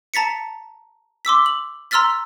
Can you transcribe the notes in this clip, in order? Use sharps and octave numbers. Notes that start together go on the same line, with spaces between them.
A5 A#5 A6 B6 C#7
C6 D6 E6 B6
F#7
A#5 C6 E6 F6 A6 B6